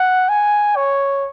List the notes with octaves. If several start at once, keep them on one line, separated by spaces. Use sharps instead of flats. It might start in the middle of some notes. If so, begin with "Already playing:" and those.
Already playing: F#5
G#5
C#5